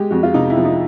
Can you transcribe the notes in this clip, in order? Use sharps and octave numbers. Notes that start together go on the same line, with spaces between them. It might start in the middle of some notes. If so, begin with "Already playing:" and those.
Already playing: G#3 G4
F2 F#4
F4
C3 D#4
E4
F3
D#4